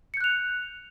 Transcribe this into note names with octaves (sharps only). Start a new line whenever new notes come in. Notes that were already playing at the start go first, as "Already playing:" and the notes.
F#6 G6 C#7 F7